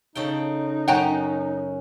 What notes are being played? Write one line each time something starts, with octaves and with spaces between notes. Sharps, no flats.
C#3 D#4 A4 G5
F#2 C#4 F#5 G5 A#5